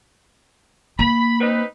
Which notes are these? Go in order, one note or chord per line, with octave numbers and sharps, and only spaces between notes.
A#3 B5
C4 D#4 B4